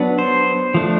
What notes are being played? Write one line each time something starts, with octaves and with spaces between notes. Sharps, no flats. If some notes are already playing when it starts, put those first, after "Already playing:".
Already playing: F#3 B3 D4
C5
F3 A3 D4